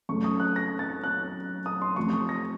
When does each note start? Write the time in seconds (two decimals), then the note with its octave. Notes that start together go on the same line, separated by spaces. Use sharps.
0.09 F#2 C#3 A3 C#4 C#6
0.24 D#6
0.40 F#6
0.56 A#6
0.79 A6
1.04 F#6
1.66 D#6
1.82 C6
1.96 F2 C3 F3 A3 C#6
2.13 D#6
2.29 A#6